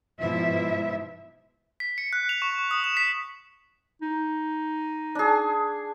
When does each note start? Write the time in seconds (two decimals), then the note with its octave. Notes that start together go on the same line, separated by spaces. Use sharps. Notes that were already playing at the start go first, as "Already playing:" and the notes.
0.20 G#2 B2 F3 E4 E5
1.80 B6
1.98 C#7
2.13 F#6
2.29 F7
2.42 C#6
2.58 C#6
2.71 D#6
2.84 E7
2.97 B6
4.02 D#4
5.15 D4 G#4